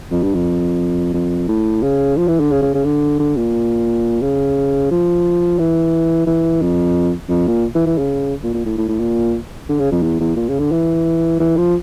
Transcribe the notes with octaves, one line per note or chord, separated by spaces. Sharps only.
F2
G2
F2
F2
A2
C#3
F3
E3
D3
C#3
C#3
C#3
D3
D3
A#2
C#3
F3
E3
E3
F2
F2
A#2
E3
E3
C#3
A#2
A#2
A2
A2
A2
A#2
D3
C#3
F2
E2
E2
A#2
C#3
D3
E3
E3
F3